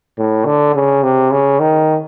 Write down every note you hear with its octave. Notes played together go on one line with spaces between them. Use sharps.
A2
D3
C#3
C3
C#3
D#3